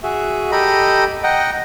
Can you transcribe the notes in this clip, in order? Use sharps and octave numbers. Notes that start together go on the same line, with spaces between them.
F#4 G#4 E5
G4 A4 D#5 A#5 B5
D#5 F#5 G5 A#5